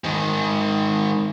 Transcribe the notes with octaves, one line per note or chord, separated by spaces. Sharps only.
G#2 D#3